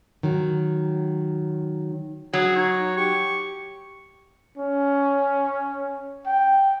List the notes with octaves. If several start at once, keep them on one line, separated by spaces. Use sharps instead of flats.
D#3 F#3
F#3 G#4
D#4 C#5
G4 C#6
C#4
G5